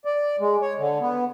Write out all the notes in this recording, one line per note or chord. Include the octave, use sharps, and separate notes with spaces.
D5
G#3
C#5
D3
B3